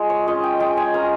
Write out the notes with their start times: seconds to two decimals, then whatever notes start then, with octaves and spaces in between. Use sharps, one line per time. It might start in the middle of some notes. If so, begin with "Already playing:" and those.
Already playing: G#3 F4
0.10 C#5
0.27 C#4 F4 D#5
0.44 G5
0.60 G#3 G5
0.77 G#5
0.94 C#4 F4 A#5